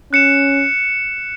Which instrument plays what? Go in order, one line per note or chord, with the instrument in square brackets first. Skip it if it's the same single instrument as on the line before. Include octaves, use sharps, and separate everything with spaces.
[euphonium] C#4 [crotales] F#6 C#7 E7